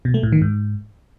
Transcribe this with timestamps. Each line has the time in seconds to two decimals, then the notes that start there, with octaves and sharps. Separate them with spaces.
0.05 B2
0.14 A3
0.23 A2
0.32 D#3
0.42 G#2